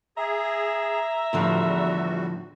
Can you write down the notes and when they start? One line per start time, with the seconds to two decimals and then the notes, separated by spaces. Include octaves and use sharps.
0.17 G#4 E5 A#5
1.33 E2 A2 D3 F3 G3 F#4